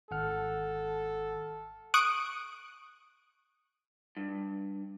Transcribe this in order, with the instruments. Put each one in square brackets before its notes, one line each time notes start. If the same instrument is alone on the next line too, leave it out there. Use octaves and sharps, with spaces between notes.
[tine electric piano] G#1 F#5 F6 [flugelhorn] A4
[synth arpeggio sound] C#6 D#6 F#6 D7
[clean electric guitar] G2